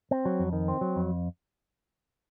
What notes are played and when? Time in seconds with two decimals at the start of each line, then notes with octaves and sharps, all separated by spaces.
0.11 C4
0.25 F#3
0.39 F2
0.53 D#3
0.68 C4
0.81 F#3
0.96 F2